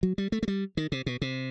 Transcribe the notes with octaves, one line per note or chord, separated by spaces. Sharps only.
F#3
G3
A3
A3
G3
D#3
C3
B2
C3